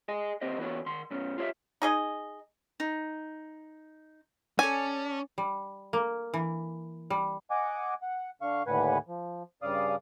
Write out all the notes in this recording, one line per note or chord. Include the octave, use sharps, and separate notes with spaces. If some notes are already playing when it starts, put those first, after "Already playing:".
G#4 D#5 G#5
D#2 C4 G4 C5 D#5
E3 B3 F#4 C#5
D#3 C6
F#2 B2 C#4
F4 G4 C#5 D#5 E5
D#4 G#4 D#5
D#4
C#4 A4 D5 G#5
G3
A#3
E3
G3
D#5 F#5 G#5 D6
F#5
D3 F5 C#6
D#2 A2 D3 B4 F#5 G#5
F3
G2 C#3 D5 F5 D#6